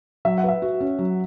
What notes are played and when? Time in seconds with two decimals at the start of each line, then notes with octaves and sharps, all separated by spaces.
0.25 F#3 E5
0.38 F#5
0.44 B4 E5
0.62 F#4
0.81 C#4
0.99 F#3